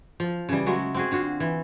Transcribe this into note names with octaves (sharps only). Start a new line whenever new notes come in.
F3
C#3 E3 G3
F#3 G#3 A3 F#4
C4 F#4 G#4
D3 F4 F#4
E3